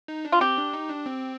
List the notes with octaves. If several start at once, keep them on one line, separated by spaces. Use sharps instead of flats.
D#4
D4
F4
C4 G4
D4
D#4
D4
C4